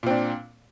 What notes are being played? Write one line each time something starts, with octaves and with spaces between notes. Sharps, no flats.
A#2 C4 D4